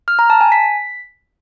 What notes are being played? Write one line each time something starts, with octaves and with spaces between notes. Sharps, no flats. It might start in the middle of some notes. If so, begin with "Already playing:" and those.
F6
A#5
A5
G#5
B6